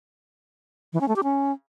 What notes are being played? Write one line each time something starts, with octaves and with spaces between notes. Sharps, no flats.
E3
C#4
A3
G4
C#4